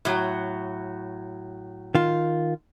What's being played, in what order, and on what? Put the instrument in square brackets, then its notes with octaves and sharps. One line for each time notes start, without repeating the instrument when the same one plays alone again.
[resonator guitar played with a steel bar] A2 F#3
[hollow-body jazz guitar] D#3 F4